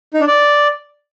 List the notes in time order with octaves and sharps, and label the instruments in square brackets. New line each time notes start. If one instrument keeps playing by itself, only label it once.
[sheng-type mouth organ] D#4
D4
D5